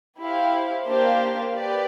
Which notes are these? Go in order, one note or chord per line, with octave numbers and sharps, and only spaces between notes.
E4 G4 C5 F5
A#3 D4 G4 C5 F5
G4 B4 D5